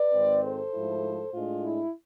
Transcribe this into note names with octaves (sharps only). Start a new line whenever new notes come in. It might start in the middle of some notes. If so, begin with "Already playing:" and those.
Already playing: B4 D5
G#1 G#2 G#3 C4
A4 C5
G#2 F3 A3 E4
A2 G#3 D4 F4
E4